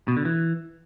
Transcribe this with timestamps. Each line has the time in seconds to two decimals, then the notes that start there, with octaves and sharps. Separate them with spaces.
0.08 B2
0.17 D3
0.25 E3